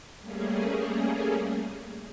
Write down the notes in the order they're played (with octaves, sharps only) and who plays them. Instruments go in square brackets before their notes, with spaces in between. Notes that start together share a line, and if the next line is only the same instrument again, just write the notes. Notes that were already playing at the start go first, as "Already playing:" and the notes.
[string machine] G3 A3 A#3 C#4 G#4